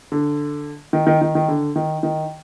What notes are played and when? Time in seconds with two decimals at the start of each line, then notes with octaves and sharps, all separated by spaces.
0.12 D3
0.93 D#3
1.07 D#3
1.22 D#3
1.35 D#3
1.48 D3
1.76 D#3
2.03 D#3